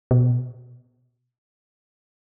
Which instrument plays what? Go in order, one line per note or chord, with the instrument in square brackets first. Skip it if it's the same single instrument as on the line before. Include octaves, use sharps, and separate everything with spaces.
[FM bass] B2